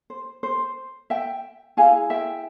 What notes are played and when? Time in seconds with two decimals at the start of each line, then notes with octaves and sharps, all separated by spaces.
0.10 C5
0.43 C5
1.10 E5 G5
1.77 E4 G#4 F5 G#5
2.10 E5 G5